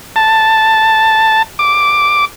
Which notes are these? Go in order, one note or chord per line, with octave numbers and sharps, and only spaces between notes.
A5
D6